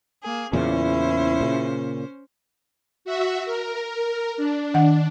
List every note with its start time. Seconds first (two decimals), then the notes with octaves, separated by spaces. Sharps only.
0.24 A#3 G#4
0.53 E2 A#2 C#3 C#4 E4 C5
1.41 A#2 C#3
3.05 F#4 E5
3.46 A#4
4.37 D4
4.74 D#3 F#5